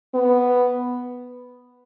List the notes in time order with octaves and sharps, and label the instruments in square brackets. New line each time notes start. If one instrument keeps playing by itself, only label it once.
[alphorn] B3